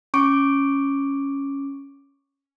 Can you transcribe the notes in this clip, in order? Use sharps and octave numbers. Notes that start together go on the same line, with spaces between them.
C#4 C#6 D6 D7